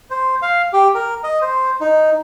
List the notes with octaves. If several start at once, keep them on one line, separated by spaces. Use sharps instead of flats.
C5
F5
G4
A#4
D#5
C5
D#4